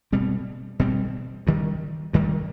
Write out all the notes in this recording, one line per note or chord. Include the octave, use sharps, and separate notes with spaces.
B2 G3 C4
B2 G3 C4
G2 D#3 G3
G2 D#3 G3